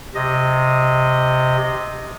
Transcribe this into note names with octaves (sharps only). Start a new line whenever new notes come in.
C3 D#5